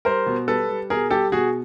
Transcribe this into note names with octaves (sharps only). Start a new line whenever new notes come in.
G3 A#4 C5
B2
G3 A4 B4
G3
B2 G#4 A#4
G3 G4 A4
B2 F#4 G#4